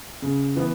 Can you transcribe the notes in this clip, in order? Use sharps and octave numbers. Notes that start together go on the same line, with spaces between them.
C#3
E3 B3